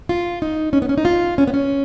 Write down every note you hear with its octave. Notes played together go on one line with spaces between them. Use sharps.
F4
D#4
C#4
B3
C#4
D#4
F4
C#4
B3
C#4